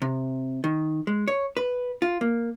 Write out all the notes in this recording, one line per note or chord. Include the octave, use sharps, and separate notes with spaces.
C3
D#3
G#3
C#5
B4
F4
A#3